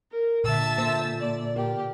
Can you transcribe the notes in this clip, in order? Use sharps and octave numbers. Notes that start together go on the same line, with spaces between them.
A#4
A#2 D3 E5 A5 E6
A#2 C5
D5
G4 A#4